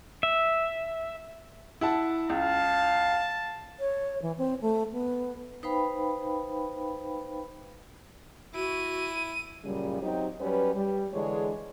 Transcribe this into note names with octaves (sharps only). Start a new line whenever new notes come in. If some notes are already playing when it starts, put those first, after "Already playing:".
E5
E4 F#5 A5
C#2 F5 A5
C#5
E3
C4
A3
B3
D#4 B4 C5 F5 G5 B5
E4 F#4 D#7
F#2 A#2 C#3 G3
F#3 C4 D#4 G4
F#3 G3 C#4 B4
G3
D3 E3 G#3 D4 G#4 C#5